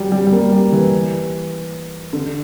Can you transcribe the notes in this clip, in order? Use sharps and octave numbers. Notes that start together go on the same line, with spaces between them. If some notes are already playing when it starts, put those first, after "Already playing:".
Already playing: F#3 G3
G3
G3
A#3
G3
E3
D3